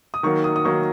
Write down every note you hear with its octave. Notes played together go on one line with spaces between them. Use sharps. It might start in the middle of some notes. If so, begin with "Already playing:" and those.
D#6
D#3 F#3 A#3 C#6
D#6
D#6
D#3 F#3 A#3 C#6